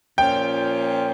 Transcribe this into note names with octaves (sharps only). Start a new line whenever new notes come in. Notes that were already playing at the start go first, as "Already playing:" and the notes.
A#2 F3 C#4 G5